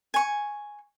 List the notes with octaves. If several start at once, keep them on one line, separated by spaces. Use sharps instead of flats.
G#5 C#6